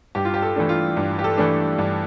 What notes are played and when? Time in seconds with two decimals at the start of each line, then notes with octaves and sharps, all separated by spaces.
0.15 G2 G4
0.25 F4
0.34 G4
0.42 A4
0.56 E3 A3 D4
0.69 F4
0.97 G2
1.19 G4
1.24 A4
1.38 E3 A3 D4
1.79 G2